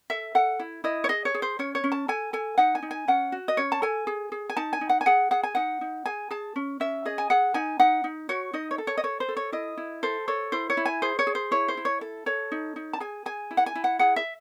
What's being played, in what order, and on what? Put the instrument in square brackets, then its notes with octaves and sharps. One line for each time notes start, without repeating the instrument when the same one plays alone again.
[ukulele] A4 E5
A4 F#5
E4
E4 D#5
C#5
G#4 D#5
C#5
G#4
C5
C#4 C#5
C#5
C#4
A5
A4 G#5
A4 G#5
D#4 F#5
G#5
D#4
G#5
C#4 F#5
F#4
D#5
C#4 C#5
A5
A4 G#5
G#4
G#4
G#5
D#4 A5
G#5
D#4
F#5
G#5
G#4 F#5
G#4 F#5
G#5
D#4 F#5
D#4
G#4 G#5
G#4 A5
C#4
C#4 E5
G#4 D#5
G#5
G#4 F#5
D#4 G#5
D#4 F#5
D#4
F#4 C#5
D#4 D#5
C#5
A4
C#5
D#5
A4 C#5
C5
A4
C#5
E4 D#5
E4
A4 C5
A4 C#5
E4 C5
C#5
E4
G#5
G#4 C5
C#5
G#4
C5
E4 C#5
C5
E4
C#5
A4
A4 C#5
D#4
D#4
A5
G#4 G#5
G#4 G#5
E4
F#5
G#5
E4
F#5
G#4 F#5
E5